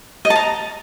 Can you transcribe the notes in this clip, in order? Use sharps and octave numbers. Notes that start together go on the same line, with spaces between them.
D#5
A5
A#5